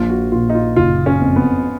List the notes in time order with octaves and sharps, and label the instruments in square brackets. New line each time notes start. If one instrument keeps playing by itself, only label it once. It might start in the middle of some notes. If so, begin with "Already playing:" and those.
Already playing: [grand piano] A#1 [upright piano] F4
[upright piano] F#4
[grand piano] A#2 [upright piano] F4
[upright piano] D#4
F4
[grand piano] F#1 [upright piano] F4
[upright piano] C#4
[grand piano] F2
[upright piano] B3